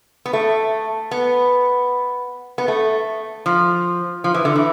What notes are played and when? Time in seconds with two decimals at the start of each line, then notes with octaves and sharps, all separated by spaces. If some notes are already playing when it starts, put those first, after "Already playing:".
0.26 B3
0.33 A3
1.11 B3
2.58 B3
2.68 A3
3.46 F3
4.24 F3
4.34 E3
4.45 D3
4.56 E3